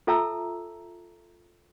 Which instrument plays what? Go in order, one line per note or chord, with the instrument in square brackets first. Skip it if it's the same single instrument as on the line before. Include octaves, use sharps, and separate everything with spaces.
[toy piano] F4 A4 E5 A5 A#5 E6